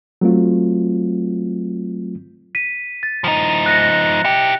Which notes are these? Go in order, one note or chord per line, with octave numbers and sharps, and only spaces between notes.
F#3 A3 C4 F4
B6 D#7
A6
F3 D#4
F#6 A#6 C#7
E4 G4 C#7